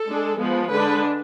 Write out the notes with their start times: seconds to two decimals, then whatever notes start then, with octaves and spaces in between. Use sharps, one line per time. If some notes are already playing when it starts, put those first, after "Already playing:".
Already playing: A4
0.08 G#3 D4
0.39 F3 G#3 B3
0.71 D3 G#3 D4 B4